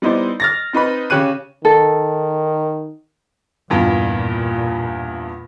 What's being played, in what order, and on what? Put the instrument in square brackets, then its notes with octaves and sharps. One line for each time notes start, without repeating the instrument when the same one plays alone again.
[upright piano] G3 B3 D#4 E4 C5 D5
F6 A6 A#6
C4 D#4 B4 B5
C#3 G4 C#5 F#6 D#7
[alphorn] D#3 [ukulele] A4
[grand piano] E2 G2 F4 [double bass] A#2